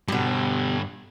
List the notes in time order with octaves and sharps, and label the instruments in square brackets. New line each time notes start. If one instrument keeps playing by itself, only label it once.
[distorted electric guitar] G2 D3 [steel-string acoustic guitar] B2 G4